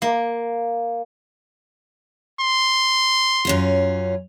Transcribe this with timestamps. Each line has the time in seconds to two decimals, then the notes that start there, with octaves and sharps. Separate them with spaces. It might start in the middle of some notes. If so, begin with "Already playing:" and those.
0.02 A#3
2.40 C6
3.45 F#2 C#4 F4